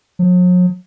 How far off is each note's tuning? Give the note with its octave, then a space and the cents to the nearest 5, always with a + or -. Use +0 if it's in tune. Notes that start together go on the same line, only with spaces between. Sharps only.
F#3 -45